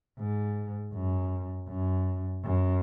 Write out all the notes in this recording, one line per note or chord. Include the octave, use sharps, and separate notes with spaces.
G#2
F#2
F#2
F#2